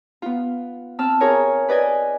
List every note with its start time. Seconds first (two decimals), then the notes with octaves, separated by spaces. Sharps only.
0.22 B3 F4
0.99 C4 A5 E6 F6
1.20 F4 G#4 A#4 C#5 G#5
1.68 B4 D5 D#5 G#5